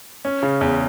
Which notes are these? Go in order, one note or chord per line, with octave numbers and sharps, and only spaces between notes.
C#4
C#3
E2